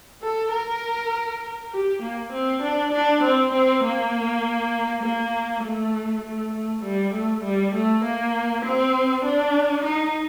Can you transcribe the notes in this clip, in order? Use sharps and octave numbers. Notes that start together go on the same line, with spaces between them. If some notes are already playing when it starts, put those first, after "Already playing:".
A4
A#4
G4
A#3
C4
D4
D4
C4
C4
A#3
A#3
A3
A3
A3
G3
A3
G3
A3
A#3
C4
D4
D#4